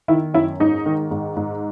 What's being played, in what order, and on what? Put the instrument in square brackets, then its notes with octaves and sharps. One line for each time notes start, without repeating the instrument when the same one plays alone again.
[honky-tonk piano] D#3 E4
F#2 E4
G#2 D#4
D#3
G#2
G#2